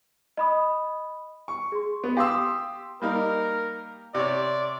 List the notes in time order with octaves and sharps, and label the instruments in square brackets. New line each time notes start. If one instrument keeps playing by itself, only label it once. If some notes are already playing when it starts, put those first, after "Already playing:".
[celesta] D#5 B5 D#6
[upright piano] C#6
[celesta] G#4 C6
[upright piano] B3
[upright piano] G4 C6 E6 [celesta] F5 D#6
[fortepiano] G3 A#3 D#4 [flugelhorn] A#4
[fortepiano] C3 C#5 [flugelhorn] D5